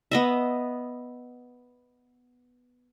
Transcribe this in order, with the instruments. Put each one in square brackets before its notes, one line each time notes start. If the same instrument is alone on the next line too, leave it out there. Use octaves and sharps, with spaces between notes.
[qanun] B3 D#5 E5